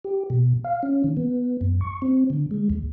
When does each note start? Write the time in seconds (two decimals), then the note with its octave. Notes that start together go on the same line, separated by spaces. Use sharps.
0.05 G4
0.30 B2
0.64 F5
0.83 C#4
1.04 D#3
1.17 B3
1.61 F#2
1.81 C#6
2.02 C4
2.30 D3
2.51 G#3
2.70 D#2